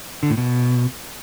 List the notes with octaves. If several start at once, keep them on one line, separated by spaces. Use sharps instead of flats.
D3
A2
B2